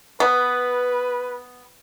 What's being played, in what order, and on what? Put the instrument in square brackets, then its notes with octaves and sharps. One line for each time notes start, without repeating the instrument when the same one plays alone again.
[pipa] B3 [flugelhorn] B4